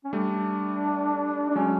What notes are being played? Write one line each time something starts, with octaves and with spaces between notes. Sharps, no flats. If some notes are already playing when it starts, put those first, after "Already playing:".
C#4
G3 A3 D4
D4
F#3 G#3 C#4